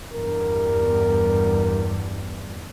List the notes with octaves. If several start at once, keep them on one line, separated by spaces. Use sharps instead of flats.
E2 G2 G3 A#4